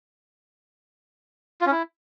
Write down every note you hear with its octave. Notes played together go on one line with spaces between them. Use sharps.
F4
C#4
E4